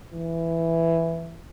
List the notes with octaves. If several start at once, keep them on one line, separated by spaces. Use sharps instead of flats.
E3